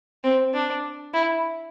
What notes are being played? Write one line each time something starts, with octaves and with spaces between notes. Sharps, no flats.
C4
D4
E4